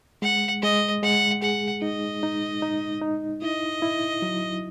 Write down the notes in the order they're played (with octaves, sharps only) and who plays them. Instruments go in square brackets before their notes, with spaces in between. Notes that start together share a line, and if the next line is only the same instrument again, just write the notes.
[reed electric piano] G#3 [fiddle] F#5
[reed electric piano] G#3 [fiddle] D#5
[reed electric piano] G#3 [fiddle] F#5
[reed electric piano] G#4 [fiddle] F#5
[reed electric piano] D#4 [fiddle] D#5
[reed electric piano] D#4
D#4
D#4
[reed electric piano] E4 [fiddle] D#5
[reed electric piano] E4
F#3